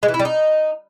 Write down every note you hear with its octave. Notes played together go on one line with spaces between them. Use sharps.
G#3
E3
E4
G3
D#4